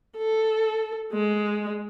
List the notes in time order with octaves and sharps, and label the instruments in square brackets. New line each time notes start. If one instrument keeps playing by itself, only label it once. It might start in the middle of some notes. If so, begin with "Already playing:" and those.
[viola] A4
G#3